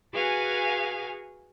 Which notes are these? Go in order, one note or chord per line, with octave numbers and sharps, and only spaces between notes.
F#4 G#4 B4 F5 G#5